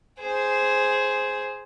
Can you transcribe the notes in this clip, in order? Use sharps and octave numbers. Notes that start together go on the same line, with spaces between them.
G#4 C5